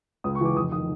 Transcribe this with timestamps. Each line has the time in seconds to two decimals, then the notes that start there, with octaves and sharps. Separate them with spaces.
0.24 C#2 D#6
0.35 C#6
0.41 C#3 E3 D6
0.56 F1 D#6
0.72 D#3 D#6